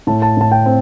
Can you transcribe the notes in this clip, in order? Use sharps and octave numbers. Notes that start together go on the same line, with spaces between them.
A2 A5
A5
A2 A5
G5
C4